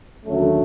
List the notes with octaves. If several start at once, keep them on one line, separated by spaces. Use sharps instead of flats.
D#2 D3 F#3 A3 C#4